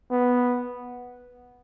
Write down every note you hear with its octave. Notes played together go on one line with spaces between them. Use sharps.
B3